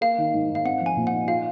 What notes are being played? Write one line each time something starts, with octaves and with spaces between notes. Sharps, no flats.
A#3 F5
D#3
G#2
G#2
F5
C4 F#5
F3
G#5
A#2
F#5
D#4
F4 F5